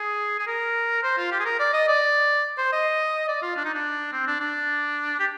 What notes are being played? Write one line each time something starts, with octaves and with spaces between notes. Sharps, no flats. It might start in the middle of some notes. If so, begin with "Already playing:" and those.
Already playing: G#4
G#4
A#4
C5
F4
G4
G#4
A#4
D5
D#5
D5
C5
D#5
D5
F4
D4
D#4
D4
C4
D4
D4
G4